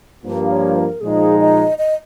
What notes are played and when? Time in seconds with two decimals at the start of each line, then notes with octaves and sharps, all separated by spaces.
0.23 G2 F3 A#3
0.50 C#5
0.75 C5
0.79 A#4
1.01 A#2 F3 G#3 D#4 G#4
1.41 D#5
1.78 D#5